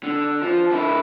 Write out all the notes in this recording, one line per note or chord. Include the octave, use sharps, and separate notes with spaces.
D3
F3
D3 E4